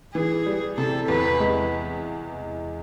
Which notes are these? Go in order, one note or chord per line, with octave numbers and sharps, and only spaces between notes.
E3 G#4
G3
C3 A4
E2 B4
G#3